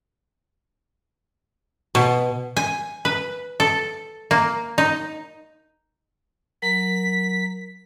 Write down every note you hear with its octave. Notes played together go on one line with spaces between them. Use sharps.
B2
G#5
B4
A4
A#3
D#4
F#3 A#4 A#5 B6